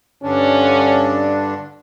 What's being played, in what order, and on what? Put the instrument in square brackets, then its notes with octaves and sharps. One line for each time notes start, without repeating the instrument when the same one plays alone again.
[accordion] G2 D3 D4 [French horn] C#4